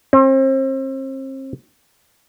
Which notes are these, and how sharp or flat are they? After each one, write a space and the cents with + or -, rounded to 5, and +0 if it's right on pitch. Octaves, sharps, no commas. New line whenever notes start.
C4 +35